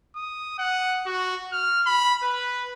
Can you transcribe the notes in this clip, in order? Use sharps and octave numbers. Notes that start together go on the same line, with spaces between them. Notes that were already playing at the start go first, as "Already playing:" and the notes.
D#6
F#5
F#4
F6
B5
B4